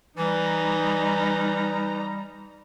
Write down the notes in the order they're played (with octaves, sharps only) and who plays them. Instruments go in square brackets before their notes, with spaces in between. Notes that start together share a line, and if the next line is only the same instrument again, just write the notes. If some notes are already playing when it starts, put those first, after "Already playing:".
[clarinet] E3 [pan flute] G3 [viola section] D#4 A#5